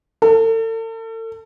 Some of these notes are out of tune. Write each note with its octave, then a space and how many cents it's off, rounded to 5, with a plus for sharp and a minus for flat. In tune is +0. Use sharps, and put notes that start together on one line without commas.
A4 +40